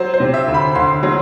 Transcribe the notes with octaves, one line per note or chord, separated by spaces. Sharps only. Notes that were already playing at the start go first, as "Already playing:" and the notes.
Already playing: F#3 C5
C5
C3
E5
D2
B5
D2 C6
F#3